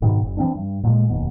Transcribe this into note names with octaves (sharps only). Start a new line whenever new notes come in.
G#2 B2 D#3
F#1
E3 C4 D4
G2
A#2 G#3
F1 D#2 B2